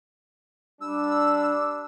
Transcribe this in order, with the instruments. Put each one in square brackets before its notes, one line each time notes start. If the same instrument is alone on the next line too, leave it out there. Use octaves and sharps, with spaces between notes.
[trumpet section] G3 D4 [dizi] E6